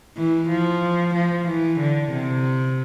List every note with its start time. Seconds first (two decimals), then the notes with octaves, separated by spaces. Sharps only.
0.17 E3
0.49 F3
1.14 F3
1.47 E3
1.79 D3
2.12 C3